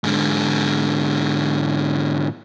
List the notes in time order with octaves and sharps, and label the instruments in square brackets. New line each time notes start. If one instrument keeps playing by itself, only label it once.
[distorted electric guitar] G#2 D3